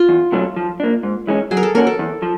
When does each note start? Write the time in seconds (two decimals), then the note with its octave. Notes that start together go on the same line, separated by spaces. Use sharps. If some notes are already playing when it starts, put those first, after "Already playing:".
Already playing: F4
0.09 E2
0.32 B2 F#3 A3 C#4
0.56 F3
0.80 A#3 D4
1.03 G#2
1.27 E3 G#3 C#4
1.51 F#3 G#4
1.57 A#4
1.63 A4
1.75 A#3 C#4 F#4 A#4
1.87 A4
1.99 E2
2.22 F3